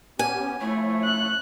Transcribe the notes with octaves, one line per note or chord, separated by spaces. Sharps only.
B3 C#4 G4 G#5
F3 A3 E4 C#5
F#6